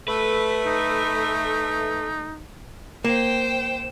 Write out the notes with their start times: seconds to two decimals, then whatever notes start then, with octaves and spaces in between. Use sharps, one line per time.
0.08 A3 B4
0.66 D#4
3.04 A#3 C5 G5 E7